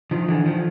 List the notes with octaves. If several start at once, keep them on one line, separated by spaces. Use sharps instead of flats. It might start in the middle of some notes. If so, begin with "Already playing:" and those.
D#3 F3
D3 E3
D#3 F3